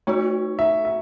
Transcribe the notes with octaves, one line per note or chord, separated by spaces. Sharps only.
A3 D#4 F#4 C#5
E5
E5